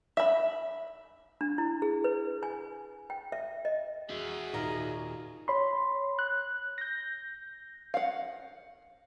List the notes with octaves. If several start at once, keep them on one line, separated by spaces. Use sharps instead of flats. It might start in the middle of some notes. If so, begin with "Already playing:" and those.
E5 B5
D4
E4
G#4
B4
G#5
G5
E5
D#5
F#4 G#4 E5
D#2 A#2 D5 F5 A#5
C#5 B5 C6
F#6
G6 A#6
F5 F#5